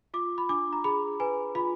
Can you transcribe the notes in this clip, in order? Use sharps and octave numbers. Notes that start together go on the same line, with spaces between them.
F4 D6
B5
D4 D6
A#5
G#4 B5
B4 G#5
F4 B5